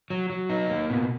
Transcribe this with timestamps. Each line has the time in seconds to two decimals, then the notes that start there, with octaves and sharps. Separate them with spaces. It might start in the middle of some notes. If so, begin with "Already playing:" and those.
0.10 F#3
0.30 F#3
0.50 D#4
0.70 A#3
0.90 B2